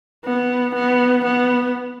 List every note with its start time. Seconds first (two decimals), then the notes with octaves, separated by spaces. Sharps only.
0.25 B3
0.75 B3
1.25 B3